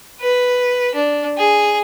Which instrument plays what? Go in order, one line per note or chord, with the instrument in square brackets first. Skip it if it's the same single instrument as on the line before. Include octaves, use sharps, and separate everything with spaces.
[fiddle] B4
D4
G#4